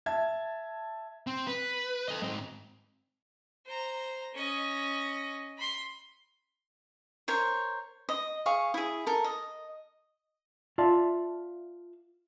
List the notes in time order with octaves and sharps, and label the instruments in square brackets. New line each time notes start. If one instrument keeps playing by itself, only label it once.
[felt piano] E5 A5 G#6
[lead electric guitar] C4
B4
A4 D#5
G#2 C4
[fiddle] C5 A#5
C#4 D#5
B5 C6
[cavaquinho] A#4 C5 C#5
D#5
G#4 F5 C#6
E4 G#4
A4 A#4
D#5
[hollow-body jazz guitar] F4 D5 E5 A5